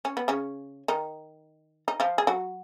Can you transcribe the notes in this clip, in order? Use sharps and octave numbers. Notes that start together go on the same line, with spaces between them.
C#4
B3
C#3 C#4
D#3 D#4
D#4
F3 F4
G#4
F#3 F#4